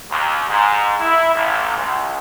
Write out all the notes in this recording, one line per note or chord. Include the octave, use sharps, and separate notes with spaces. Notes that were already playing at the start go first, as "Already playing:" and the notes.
D#2
G#2
E4
A1
C#2